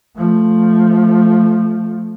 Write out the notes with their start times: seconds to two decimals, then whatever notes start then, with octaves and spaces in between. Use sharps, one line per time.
0.17 F3 A3